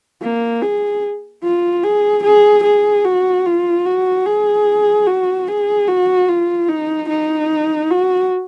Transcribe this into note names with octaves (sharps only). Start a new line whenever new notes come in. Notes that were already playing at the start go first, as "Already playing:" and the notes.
A#3
G#4
F4
G#4
G#4
G#4
F#4
F4
F#4
G#4
F#4
G#4
F#4
F4
D#4
D#4
F#4